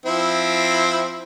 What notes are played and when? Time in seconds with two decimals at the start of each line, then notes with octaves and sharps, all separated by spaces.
0.06 F3 C4 E4